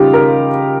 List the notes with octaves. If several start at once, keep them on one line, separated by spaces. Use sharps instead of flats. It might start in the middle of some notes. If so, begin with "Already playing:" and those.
Already playing: C#3 G3 D#4 F4 G4
A#4